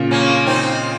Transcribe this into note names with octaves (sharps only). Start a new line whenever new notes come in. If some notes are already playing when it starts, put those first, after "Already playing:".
Already playing: A#2 C#3
A#3 C#4
C4 D#4